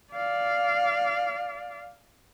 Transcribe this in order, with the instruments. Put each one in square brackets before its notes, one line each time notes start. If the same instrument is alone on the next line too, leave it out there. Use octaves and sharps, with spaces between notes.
[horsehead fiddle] D5 F5